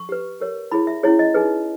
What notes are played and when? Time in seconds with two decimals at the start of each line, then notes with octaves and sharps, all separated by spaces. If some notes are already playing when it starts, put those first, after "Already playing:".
Already playing: C#6
0.09 G4 B4
0.40 G4 A#4 C#5
0.72 E4 G#4 C#5 B5
0.87 E5
1.03 C#4 E4 G#4 C#5
1.19 D#5
1.34 D#4 G#4 B4